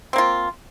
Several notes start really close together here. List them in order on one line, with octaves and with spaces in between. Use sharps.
C4 A#3 F4